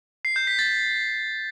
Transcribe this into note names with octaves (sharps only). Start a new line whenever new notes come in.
C7
G6
B6
A6